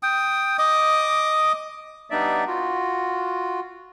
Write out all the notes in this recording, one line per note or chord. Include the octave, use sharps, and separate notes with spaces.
G5 D#6
D#5 D6 D#6
G3 B3 D4 D#4 D5 E5
F4 F#4